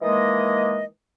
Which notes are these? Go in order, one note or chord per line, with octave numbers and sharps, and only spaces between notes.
D#3 E3 G#3 A#3 D#5